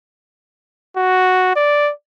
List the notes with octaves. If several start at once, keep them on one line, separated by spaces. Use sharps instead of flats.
F#4
D5